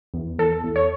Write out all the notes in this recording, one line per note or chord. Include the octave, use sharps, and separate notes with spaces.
E2
E2 A4
E2
C#5